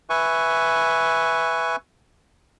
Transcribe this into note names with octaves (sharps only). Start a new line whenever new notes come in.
B4 E5 G#5 C#6